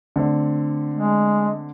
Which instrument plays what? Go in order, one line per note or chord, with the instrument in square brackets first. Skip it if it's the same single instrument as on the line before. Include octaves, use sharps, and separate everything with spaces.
[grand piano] D3 A3 C4
[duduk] G#3